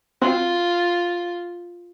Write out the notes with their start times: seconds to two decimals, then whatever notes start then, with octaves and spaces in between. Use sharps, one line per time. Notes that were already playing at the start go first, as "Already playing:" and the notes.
0.22 C4 F4 F#4